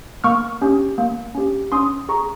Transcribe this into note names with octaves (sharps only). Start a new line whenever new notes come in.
A#3 C#6 F6
C#4 G4
A#3
C#4 G4
C#4 C6 D#6
G#4 A#5 C#6